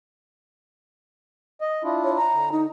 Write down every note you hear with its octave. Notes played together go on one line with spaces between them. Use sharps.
D#5
D4 E4 F4
C#5
A#5
D3
D#4